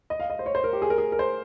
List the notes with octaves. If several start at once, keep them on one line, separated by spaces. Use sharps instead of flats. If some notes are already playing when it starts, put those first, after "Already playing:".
D#5
F5
D#5
C5
C#5
C5
A#4
G4
G#4
A#4
G#4
A#4
C5